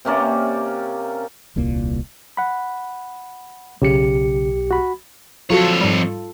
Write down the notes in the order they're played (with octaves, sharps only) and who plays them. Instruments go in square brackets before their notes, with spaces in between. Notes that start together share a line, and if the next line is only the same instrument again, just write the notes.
[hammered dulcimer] C3 A#3 C#4 D5
[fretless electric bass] D#1 C2 A#2 A#3
[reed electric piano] F#5 B5
[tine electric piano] B1 G4 C#7 [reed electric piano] C#3
[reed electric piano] F#4 B5
[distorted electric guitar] F2 C#5 [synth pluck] F#3 F#4 [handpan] F4 A4
[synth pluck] G#2 G3